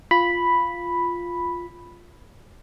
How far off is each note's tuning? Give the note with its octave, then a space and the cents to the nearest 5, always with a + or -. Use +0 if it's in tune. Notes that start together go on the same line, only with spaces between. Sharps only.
F4 +0 B5 +0